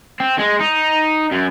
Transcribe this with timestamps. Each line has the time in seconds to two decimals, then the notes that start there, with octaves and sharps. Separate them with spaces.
0.20 C4
0.38 G#3
0.59 D#4
1.31 F#2